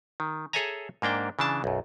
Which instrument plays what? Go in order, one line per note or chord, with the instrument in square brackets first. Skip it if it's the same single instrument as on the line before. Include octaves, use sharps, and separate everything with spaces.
[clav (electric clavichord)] D#3
G#4 A4 C#5 E5 G#5 A#5
G#2 A#3 D4 G5
C#3 E3 D4 A5
B1 F#2